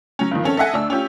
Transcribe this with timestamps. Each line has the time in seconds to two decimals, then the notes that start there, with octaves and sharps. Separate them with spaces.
0.19 F#3 C#4
0.31 G2 D#3 F3
0.44 C4 C#4 A4
0.57 A4 D#5 E5 F#5 G#5
0.73 D2 D4 E6
0.90 C#4 F4 G4